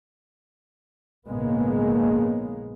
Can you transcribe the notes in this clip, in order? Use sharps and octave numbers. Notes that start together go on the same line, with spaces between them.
A#1 G#2 C#3 G#3 A#3 B3